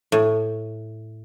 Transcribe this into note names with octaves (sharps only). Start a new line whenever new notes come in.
A2